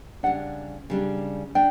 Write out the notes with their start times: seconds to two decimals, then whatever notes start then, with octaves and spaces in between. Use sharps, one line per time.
0.23 C#3 G3 D4 F#5
0.90 C#3 G3 D4
1.55 D4 G5